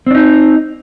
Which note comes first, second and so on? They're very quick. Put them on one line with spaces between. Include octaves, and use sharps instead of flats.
C4 D4 D#4